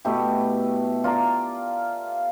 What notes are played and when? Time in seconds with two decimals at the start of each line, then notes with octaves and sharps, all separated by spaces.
0.05 B2 A3 E4 G4
1.04 F4 D5 A#5